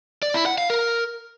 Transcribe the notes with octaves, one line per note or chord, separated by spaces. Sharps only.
D5
E4
F#5
F5
A#4